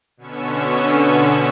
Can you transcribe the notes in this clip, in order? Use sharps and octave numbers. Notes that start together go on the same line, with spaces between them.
B2 D3 B3 C#4 C#6 E6